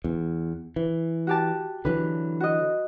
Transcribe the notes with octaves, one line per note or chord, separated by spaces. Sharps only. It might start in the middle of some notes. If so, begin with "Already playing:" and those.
E2
E3
F#4 G4 A5
D3 E3 F#3 B4
F#4 D#5